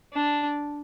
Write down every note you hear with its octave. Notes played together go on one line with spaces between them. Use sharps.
D4